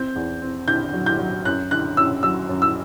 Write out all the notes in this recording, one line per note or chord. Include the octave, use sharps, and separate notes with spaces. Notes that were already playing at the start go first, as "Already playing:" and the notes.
Already playing: C4 G6
E2
C4
D3 G6
F#3
G6
F#3
F#2 F#6
D3 F#6
F#2 E6
F#3 E6
F#2
E6